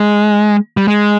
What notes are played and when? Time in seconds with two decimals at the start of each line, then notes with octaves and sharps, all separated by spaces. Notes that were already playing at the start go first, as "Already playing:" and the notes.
Already playing: G#3
0.77 G3
0.88 G#3